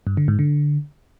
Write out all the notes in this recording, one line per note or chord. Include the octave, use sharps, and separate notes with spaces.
G2
D3
G#2
D3